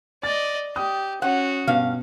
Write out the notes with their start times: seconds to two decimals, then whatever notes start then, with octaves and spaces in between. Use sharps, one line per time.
0.23 D5 D#5 A6
0.76 G4 D#6
1.22 C#4 F#4 F#5
1.67 G2 B2 F5